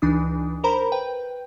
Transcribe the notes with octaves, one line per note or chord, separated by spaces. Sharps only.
C#2 E3 D4 D#4 D#6
A#4 C5 A#5 B5
B4 G5